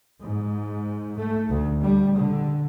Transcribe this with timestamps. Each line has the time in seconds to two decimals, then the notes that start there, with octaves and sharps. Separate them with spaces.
0.24 G#2
1.19 A3
1.50 D2
1.83 G3
2.19 D3